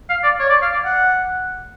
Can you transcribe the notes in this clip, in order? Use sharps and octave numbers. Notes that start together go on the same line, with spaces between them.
F5
D5
C#5
D5
F5
D5
F#5